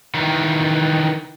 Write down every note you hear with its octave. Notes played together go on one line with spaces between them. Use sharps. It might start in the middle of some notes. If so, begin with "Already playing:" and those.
D#3 E3